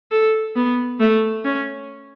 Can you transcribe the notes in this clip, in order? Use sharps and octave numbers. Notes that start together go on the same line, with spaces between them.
A4
B3
A3
C#4